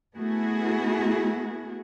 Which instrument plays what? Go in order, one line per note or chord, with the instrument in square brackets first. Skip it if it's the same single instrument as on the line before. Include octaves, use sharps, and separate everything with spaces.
[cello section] A3 B3 E4 F#4 G#4